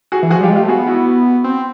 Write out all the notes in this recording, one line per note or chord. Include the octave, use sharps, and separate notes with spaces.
F#4 G#4
E3
F3 F#4 G#4
G3 F4 G4
G#3
F4 G4
A3
B3 F#4 G#4
E4 F#4
C4